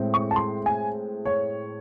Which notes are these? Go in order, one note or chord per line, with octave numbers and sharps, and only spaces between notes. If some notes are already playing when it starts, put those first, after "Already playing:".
Already playing: A2 G#3 C4
C#6
A5
C6
G#5
C#5